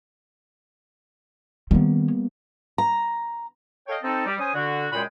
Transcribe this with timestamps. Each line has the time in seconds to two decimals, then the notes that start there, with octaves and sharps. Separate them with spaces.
1.71 D#3 G3 A#3 B3 C#4
2.78 A#5
3.88 A4 C#5 D#5 F5 G5
4.03 C4 D#4 A4
4.26 G3
4.38 C#4 C5 G#5 D#6
4.53 D3 F#4
4.92 F#2 A#2 G#3 G#4 G5 B5